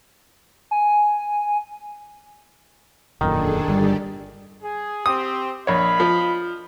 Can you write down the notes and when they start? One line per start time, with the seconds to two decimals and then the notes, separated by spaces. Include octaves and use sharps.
0.71 G#5
3.21 E1 F#2 A#2 D#3 D4 G#4 A4
3.68 G1 G3 G4 D5
4.63 G#4
5.06 C4 G4 D#6
5.67 A#1 C#5 D#5 F5 B5
6.00 F3